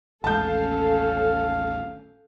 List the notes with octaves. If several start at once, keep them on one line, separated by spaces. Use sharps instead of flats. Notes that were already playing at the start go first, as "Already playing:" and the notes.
A1 D#2 G#3 C#4 A4 F5 A5 G6